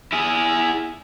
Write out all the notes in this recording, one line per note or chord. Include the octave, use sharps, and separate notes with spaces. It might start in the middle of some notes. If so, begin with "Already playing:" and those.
E4 G#4